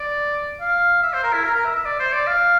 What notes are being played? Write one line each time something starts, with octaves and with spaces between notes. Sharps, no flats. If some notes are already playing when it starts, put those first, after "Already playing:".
Already playing: D5
F5
E5
C5
A#4
E4
A#4
A#4
E5
E5
D5
C5
D5
F5